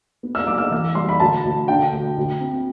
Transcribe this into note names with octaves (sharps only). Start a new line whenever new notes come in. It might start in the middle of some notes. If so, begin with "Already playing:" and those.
B3
E6
F#3 D6
E6
E3 E6
G3 C6
B5
D2 A5
D2
D3 G5
D2
D2
C4